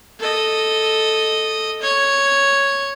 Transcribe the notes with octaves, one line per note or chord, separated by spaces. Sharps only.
A4 D#5
C#5